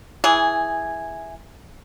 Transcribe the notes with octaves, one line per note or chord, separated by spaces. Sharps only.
E3 G#4